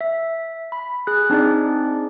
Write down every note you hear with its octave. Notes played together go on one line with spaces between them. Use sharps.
E5
B5
G#4 F#6
C4 D4 D#4 G#4 D5